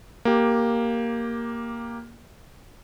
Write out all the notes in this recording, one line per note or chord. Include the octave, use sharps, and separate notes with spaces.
A#3 G4